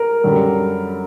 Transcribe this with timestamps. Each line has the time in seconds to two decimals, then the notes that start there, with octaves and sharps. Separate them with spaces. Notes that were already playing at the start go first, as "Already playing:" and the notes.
Already playing: A#4
0.24 F#2 D3 G3